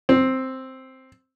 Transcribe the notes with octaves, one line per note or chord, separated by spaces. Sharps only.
C4